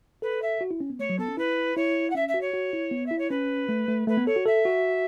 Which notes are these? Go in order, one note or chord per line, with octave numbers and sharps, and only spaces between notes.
A4 B4
E5
F#4
E4
C#4
B3
A3 C#5
F#3
B3 A4
C#4
E4 B4
E4 C#5
F#5
C#4 E5
E5
F#4
C#5
F#4
E4
B3
E4 E5
C#5
C#4 B4
A3
A3
A3 B4
B3
A4 C#5
F#4
A4 E5
F#4